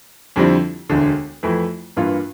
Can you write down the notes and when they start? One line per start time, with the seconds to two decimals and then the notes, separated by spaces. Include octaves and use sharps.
0.36 F2 D3 G3 C4 E4
0.89 E1 D2 D3
1.43 F2 E3 A3 E4
1.97 G2 E3 A#3 F4